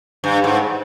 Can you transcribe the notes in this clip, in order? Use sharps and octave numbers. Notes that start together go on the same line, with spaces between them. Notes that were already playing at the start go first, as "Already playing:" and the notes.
G2
G#2